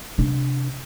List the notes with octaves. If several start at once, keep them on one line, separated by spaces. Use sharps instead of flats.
C3 D4